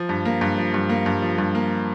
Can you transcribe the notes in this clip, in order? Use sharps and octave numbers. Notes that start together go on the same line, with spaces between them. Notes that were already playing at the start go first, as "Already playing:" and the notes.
Already playing: F3
G2
A#3
G2
F3
G2
A#3
G2
F3
G2
A#3